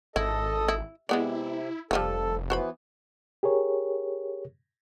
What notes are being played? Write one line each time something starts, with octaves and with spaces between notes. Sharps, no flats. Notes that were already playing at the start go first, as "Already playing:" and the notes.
G#1 E4 A4 D#5
E4
C3 G#3 B3 E4 D5
F1 E3 F3 G3 A4
E3 B3 F#4 C5 B5
G4 G#4 A#4 C#5